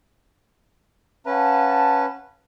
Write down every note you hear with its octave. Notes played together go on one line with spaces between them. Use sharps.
C#4 B4 F5 F#5 A5